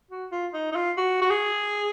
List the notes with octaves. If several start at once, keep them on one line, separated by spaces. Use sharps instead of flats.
F#4
F4
D#4
D#4
F4
F#4
F#4
G#4